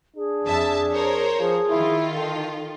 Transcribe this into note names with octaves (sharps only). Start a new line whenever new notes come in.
D4 G#4
F2 E5 A5
A#4 C5 C#5
F3 G#4
D#3 E4 F4
A4 G5